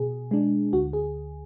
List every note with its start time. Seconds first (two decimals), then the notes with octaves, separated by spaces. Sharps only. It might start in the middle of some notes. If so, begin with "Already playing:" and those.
Already playing: B2 G#4
0.31 G#3 D4
0.73 D2 F#4
0.93 G#4